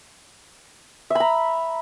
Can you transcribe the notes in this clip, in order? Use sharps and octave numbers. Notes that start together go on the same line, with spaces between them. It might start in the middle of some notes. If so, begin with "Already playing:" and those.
E5 A#5 B5